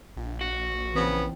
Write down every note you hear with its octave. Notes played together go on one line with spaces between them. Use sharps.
A#1
F#4
C#3 E3 B3 C4